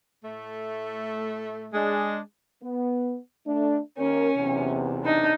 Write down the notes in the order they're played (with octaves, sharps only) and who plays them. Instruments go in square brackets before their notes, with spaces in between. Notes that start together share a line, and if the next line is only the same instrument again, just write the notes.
[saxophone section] A2 A3
[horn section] G#3 D4
[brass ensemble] B3
A3 D4
[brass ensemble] D#2 A#4 [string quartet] C#4
[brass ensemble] B1 E2 C3
[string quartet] D4 D#4